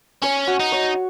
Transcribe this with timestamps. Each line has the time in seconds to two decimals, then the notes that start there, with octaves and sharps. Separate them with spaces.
0.22 C#4 C#5
0.47 F#4
0.60 D#4
0.72 C#5